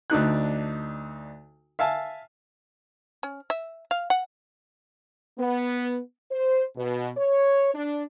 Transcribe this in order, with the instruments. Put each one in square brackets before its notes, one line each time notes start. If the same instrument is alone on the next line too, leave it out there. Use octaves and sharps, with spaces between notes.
[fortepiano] D2 D4 D#4 F#6
E5 F5 G#5 A5
[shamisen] C#4
E5
F5
F#5
[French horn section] B3
C5
B2
C#5
D4